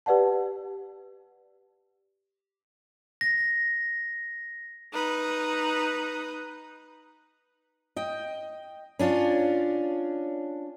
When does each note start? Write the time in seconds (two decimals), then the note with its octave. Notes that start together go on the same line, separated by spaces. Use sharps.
0.06 G4 B4 D5 F#5 A5
3.21 A#6
4.93 D#4 B4
7.96 D#5 G5
8.99 C#4 D4 F4 C#5